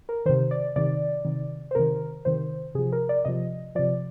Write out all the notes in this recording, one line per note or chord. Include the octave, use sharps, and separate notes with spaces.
A#4
C3 D#3 C5
D5
C3 D#3 D5
C3 D#3
C5
C3 D#3 A#4
C3 D#3 C5
C3 F3 G#4
A#4
D5
C3 F3 D#5
C3 F3 D5